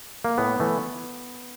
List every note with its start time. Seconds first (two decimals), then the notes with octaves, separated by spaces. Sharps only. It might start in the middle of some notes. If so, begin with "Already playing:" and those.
0.25 A#3
0.38 A2 B3
0.60 E3 A3